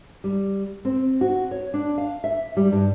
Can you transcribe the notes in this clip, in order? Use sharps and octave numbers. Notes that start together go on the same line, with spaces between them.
G3
C4
F#4
C#5
D4
F5
E5
G3
G2